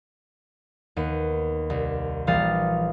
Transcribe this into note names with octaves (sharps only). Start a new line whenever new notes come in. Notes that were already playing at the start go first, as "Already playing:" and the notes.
D#2 B3 D#7
C2
A#1 E3 G3 F5 D#6 A6